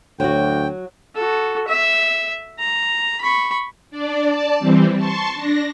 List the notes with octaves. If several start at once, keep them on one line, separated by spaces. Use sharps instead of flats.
D2 F#3 F#4 G5
F#4 A4
E5
A#5
B5 C#6
D4 D5
D5 A5
E3 G3 C4
A5 C6 C#6
D4 A#6